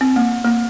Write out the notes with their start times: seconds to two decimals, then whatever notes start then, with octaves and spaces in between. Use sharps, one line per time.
0.01 C4
0.16 A#3
0.45 A#3